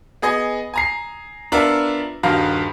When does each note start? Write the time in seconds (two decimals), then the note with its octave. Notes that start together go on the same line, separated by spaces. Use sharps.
0.22 B3 G#4 D#5 G#5
0.74 G#5 A#5 C7
1.52 B3 D4 F4 A#4 E5
2.23 D#1 G2 D#3 F#4 F5 A#5